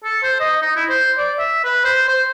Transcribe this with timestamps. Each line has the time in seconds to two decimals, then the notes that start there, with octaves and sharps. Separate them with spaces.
0.04 A4
0.23 C5
0.40 D#5
0.62 D#4
0.76 E4
0.89 C5
1.18 D5
1.39 E5
1.64 B4
1.85 C5
2.08 C5